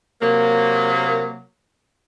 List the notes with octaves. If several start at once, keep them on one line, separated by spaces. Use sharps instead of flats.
C3 F#3 A#3